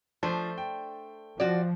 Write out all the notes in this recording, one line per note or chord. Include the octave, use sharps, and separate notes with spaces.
F3 A3 D4 C5
G5
F3 F#4 D5